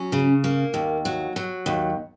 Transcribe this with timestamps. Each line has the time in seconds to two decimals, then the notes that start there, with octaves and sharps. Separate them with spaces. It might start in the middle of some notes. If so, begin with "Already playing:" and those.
Already playing: F#3 C#4
0.12 C#3
0.44 A#3
0.74 D#2
1.05 F#3
1.36 F#3
1.66 D#2